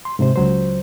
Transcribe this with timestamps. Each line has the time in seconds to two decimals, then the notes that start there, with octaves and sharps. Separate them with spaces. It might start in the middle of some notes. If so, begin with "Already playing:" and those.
0.05 C6
0.19 G#2 C3 C5
0.36 C#2 F#3 C5